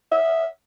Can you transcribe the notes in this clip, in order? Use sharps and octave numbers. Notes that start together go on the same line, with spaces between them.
E5